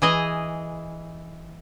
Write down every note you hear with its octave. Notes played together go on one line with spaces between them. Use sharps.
E3 G#4 D#5